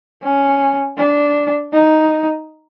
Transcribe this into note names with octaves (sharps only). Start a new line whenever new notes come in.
C#4
D4
D#4